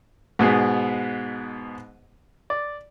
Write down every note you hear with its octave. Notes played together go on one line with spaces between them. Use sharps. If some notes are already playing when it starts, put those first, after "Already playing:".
G#2 B2 B3 G#4
D5